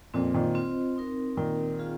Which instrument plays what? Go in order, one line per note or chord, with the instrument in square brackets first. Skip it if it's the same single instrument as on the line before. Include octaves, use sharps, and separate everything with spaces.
[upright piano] F2 A#2 [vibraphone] C4 F4 C5 D#5
[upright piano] A#2 D#3
[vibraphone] C4 F4 C5 D#5
C4 D#4 A#4
[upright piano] A#2 D#3 [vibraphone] C4 D#4 A#4
[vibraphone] C4 F4 G#4 F5